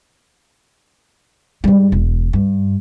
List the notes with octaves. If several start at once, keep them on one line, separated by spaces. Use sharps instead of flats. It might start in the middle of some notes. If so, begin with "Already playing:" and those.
G#2 G3
E1
G2